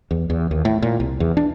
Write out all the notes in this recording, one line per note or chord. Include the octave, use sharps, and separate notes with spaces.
E2
E2
D#2
A2
A#2
C2
E2
D4